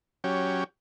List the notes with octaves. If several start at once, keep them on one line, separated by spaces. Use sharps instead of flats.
F#3 C#4 G4